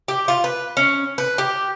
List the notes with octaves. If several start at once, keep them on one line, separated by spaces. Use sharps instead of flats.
G4
F4
B4
C#4
B4
G4